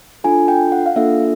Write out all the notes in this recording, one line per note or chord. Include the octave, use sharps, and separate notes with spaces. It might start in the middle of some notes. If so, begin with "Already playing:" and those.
D4 F4 A4 G#5
G5
F#5
F5
A#3 D4 F4 A4 E5